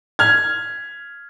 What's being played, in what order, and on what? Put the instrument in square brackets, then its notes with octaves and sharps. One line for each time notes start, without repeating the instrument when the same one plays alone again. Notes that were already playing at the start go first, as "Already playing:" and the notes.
[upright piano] F6 G#6